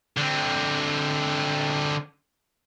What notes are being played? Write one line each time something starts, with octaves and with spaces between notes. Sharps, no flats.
D3 C4